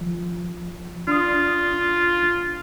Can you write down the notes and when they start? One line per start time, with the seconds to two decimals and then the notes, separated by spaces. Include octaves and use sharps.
0.01 F3
1.08 D4 F4 D#6